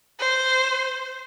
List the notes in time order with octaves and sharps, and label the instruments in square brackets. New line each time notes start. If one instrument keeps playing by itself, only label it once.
[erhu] C5